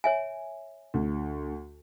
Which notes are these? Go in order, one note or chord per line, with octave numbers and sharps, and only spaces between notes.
C#5 E5 G#5
D2